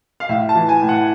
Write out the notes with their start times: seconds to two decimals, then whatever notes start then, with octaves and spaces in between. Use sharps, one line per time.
0.20 F5
0.29 A2 E5
0.49 A5
0.55 E3
0.69 G#5
0.82 A2
0.89 F#5